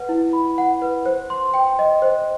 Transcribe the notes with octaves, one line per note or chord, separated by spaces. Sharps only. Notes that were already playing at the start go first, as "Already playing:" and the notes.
Already playing: B4 F#5
E4
B5
F#5
B4
C5
C6
G5
D#5
C5